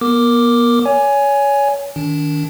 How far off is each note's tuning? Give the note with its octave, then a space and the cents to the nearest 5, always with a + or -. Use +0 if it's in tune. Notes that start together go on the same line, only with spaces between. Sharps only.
B3 -40 A#4 +0 D6 +0
C#5 +25 G#5 +0
D#3 +0 D4 -30